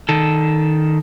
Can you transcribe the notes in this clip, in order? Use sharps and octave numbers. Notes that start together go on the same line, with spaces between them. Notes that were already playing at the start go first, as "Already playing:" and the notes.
D#3 A4